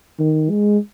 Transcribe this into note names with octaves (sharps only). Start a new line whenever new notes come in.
D#3
G#3